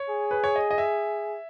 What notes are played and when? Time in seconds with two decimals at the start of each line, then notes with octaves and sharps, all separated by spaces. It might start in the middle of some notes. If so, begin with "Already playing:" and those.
Already playing: C#5
0.10 G#4
0.31 B4
0.44 C#5
0.56 D#5
0.71 D#5
0.78 E5